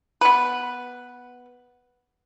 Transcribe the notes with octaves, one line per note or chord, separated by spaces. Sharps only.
B3 B4